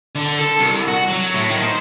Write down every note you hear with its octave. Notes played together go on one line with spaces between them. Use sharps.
D3
A4
C2
F#4
F#3
A2
D#3
C5